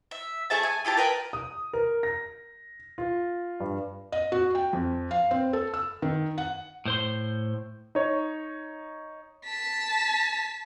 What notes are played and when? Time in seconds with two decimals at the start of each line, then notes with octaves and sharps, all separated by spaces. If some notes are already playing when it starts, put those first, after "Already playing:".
0.11 E5
0.50 A3 G#4 E5 A5
0.63 G#5
0.85 E4 F4 G4 A5
0.97 A#4 B4 G5
1.33 D#6
1.73 A#4
2.03 A#6
2.98 F4
3.60 G2
4.12 D#5
4.32 F#4
4.55 G5
4.73 F2
5.11 F5
5.31 C4
5.53 A4
5.74 E6
6.02 D#3
6.38 F#5
6.85 A2 C5 C6
7.95 D#4 C#5
9.45 A5 B6